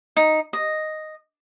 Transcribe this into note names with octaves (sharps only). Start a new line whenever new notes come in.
D#4
D#5